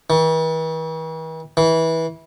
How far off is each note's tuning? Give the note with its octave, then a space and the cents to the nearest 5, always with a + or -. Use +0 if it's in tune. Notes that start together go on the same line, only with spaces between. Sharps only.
E3 -45
E3 -20